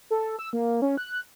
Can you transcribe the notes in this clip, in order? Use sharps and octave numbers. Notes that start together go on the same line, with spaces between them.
A4
E6
A#3
C#4
F#6